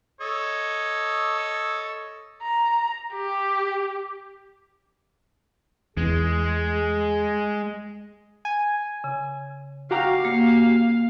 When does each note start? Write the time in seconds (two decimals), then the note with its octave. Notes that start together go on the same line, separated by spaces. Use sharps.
0.21 A4 C#5 D#5
2.42 A#5
3.14 G4
5.97 E2 G#3 G#4
8.45 G#5
9.04 C#3
9.91 F#4 G4 F5 A#5
10.25 A#3